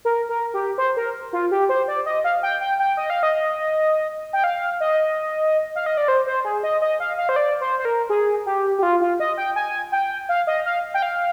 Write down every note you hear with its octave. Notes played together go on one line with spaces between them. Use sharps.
A#4
A#4
G4
C5
A#4
F4
G4
C5
D5
D#5
F5
G5
G5
G5
D#5
F5
D#5
G5
F5
D#5
F5
D#5
D5
C5
C5
G#4
D#5
D#5
F5
F5
C5
D5
C5
C5
A#4
G#4
G4
G4
F4
F4
D#5
G5
G#5
G5
F5
D#5
F5
G5
F5